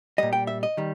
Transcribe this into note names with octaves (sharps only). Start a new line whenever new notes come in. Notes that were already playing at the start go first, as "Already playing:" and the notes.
A#2 G3 D#5
G5
E5
D#5
D#3 G3